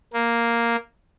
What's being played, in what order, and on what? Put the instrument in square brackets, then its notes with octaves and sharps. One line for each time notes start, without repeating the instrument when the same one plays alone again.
[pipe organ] A#3